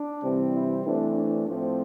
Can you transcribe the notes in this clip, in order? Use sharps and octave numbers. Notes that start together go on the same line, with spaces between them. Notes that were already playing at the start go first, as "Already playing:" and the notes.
Already playing: D4
C3 E3 G3 C4
E4
E3 A3 C4 D4
D4
A2 F3 A3 C4 D4